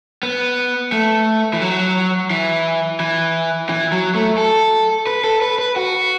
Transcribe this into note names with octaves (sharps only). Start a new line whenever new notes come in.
B3
A3
E3
F#3
E3
E3
E3
F#3
A3
A4
B4
A4
B4
B4
F#4